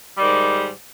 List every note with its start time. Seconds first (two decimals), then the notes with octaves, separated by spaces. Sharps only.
0.17 G3
0.19 D#3
0.22 G#2